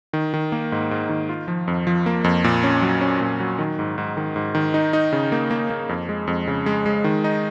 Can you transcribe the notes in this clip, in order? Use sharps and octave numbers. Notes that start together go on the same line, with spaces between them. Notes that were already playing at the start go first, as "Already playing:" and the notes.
D#3
D#3
A#3
G#2
G#2
D#3
F4
F3
F2
F3
A#3
F2
A#2
C#4
F#3
C#4
A#2
F#3
D#3
G#2
G#2
D#3
G#2
D#3
D#4
D#4
C#3
A#3
A#3
A#3
F2
G#3
F2
C#3
G#3
G#3
D#3
D#4